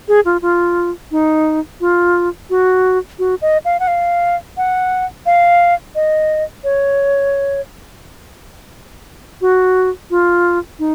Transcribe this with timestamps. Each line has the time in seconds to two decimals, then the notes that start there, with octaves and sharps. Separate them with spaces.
0.08 G#4
0.25 F4
0.42 F4
1.11 D#4
1.81 F4
2.50 F#4
3.19 F#4
3.42 D#5
3.65 F5
3.80 F#5
3.88 F5
4.57 F#5
5.26 F5
5.95 D#5
6.64 C#5
9.41 F#4
10.10 F4
10.79 D#4